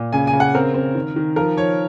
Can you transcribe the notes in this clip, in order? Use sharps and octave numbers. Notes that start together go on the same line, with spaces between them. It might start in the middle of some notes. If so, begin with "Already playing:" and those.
Already playing: A#2
C#3 G#5
G#5
C#3
F#5
C4 A#4
C4
D#3
D#3
F3 A#4
F3 C#5